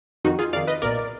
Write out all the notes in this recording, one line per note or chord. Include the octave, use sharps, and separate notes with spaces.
F2 D#3 D#4 F#4
F4 G#4
F2 D#3 D5 F5
B4 D#5
B1 A#2 A#4 D5